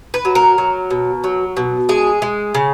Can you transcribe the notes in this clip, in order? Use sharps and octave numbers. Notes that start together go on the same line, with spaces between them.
B4
F#3
A#4
F#3
B2
F#3
B2
G#3 G#4
G#3
C#3